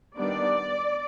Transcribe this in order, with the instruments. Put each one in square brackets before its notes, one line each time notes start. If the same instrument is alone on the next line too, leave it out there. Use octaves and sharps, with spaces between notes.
[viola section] D#3 G3 B3 D4 D5